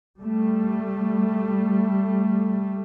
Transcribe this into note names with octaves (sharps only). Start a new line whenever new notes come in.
G3 A3